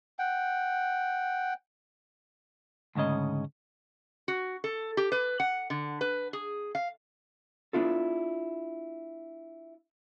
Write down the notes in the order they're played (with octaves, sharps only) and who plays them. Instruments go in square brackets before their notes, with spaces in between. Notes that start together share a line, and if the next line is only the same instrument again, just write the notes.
[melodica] F#5 G5
[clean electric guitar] D2 G#2 C#3 C#4 D#5
[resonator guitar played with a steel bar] F#4
A4
G4
B4
F#5
D3
B4
G#4
F5
[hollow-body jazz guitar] B3 D4 E4 F4 A4